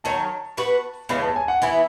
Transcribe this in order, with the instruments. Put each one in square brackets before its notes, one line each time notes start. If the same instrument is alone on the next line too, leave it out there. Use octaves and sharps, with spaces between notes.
[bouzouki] D#3 F#3 C#4 [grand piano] A5
[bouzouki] B3 F#4 B4
[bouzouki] C#3 E3 G#3 B3 [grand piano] B5
[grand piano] A5
G#5
F#5
[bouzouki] E3 B3 E4 [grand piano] G#5